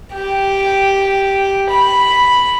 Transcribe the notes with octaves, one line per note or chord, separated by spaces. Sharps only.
G4
B5